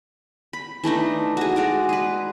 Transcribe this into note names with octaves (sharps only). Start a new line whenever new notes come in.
B5
E3 A3 D4 D#4
F#4 G#4
G#3 F#4 D5
G#4 B4